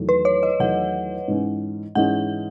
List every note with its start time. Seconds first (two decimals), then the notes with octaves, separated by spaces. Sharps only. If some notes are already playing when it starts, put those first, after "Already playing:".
Already playing: E2 D#3 F#3 A3
0.09 B4
0.25 C#5
0.43 D#5
0.60 E2 D#3 F#3 A3 F#5
1.28 G#2 E3 G#3 C#4
1.95 G#2 E3 G#3 C#4 F#5